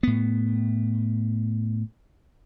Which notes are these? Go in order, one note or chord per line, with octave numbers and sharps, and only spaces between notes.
A2 B3